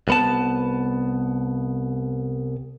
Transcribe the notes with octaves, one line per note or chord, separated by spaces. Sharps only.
C2 B3 A5